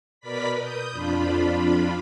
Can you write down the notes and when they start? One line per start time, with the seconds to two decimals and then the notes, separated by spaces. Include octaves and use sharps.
0.20 B2 A#4 B4 D5 B5 B6
0.58 D#6 G6
0.91 F2 D4 F4 B5